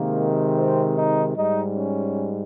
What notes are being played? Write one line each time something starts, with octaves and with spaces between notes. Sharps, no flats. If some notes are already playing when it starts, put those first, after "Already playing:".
Already playing: C3 D#3 G#3 A#3
C4
D#4
G#2 G3 D#4
C#4